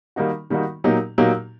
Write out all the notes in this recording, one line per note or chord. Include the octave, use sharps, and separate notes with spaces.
D#3 G3 A#3 D#4 F#4
D#3 G3 A#3 D#4 F#4
A#2 F#3 A#3 D#4 G4
A#2 F#3 A#3 D#4 G4